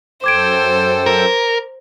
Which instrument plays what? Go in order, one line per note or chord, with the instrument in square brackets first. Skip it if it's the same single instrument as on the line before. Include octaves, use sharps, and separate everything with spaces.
[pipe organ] F#2 A4 G5 [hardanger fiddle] C5 [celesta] D6 G#6 D7
[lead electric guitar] A#4